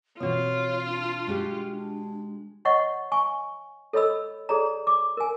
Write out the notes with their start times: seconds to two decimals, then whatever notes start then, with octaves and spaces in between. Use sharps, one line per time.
0.20 B2 E3 C4 F4 F#4 C#5
0.86 D4
1.27 G#3 F#4 G4
1.73 D4
2.65 C#5 D#5 F#5 C#6
3.12 G#5 C#6
3.93 A4 C#5 D#5 B5 E6
4.49 G#4 A4 C#5 D5 A#5
4.87 D6
5.17 A#4 G#5